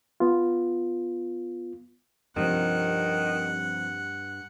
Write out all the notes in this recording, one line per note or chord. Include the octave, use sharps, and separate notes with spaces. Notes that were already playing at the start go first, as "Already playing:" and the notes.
B3 F4
C2 G2 D#3 F3 F#5